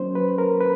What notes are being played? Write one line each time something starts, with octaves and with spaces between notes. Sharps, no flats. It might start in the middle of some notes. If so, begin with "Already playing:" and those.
Already playing: F#3 A#3 C#4 C5
B4
A#4
B4